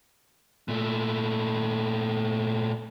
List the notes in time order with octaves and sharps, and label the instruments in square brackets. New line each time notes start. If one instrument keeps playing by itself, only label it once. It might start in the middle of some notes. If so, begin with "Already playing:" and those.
[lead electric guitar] A#2 A3